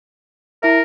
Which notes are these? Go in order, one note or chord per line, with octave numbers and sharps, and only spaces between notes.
E4 A#4 E5